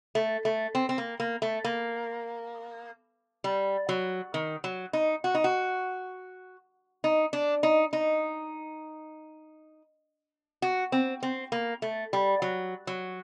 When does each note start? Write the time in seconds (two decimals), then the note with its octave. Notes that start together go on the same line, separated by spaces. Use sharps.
0.15 A3
0.45 A3
0.75 C4
0.89 C4
0.98 A#3
1.20 A#3
1.42 A3
1.64 A#3
3.44 G3
3.89 F#3
4.34 D#3
4.64 F#3
4.93 D#4
5.24 F#4
5.35 D#4
5.44 F#4
7.04 D#4
7.33 D4
7.63 D#4
7.93 D#4
10.62 F#4
10.92 C4
11.23 C4
11.52 A#3
11.82 A3
12.13 G3
12.42 F#3
12.87 F#3